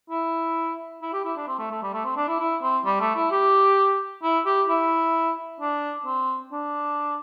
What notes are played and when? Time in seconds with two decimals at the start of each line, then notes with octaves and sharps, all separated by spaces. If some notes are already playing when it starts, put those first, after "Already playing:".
0.10 E4
1.02 E4
1.13 G4
1.25 E4
1.37 D4
1.48 C4
1.59 A3
1.71 A3
1.82 G3
1.93 A3
2.05 C4
2.17 D4
2.28 E4
2.40 E4
2.62 C4
2.85 G3
3.00 A3
3.16 E4
3.31 G4
4.23 E4
4.46 G4
4.69 E4
5.61 D4
6.06 C4
6.52 D4